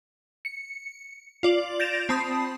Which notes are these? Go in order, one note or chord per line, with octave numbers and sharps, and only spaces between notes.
C#7
F4 D5 F#7
G6 A6 A#6 D7 E7 F7
C4 A5 B5 D#6 C7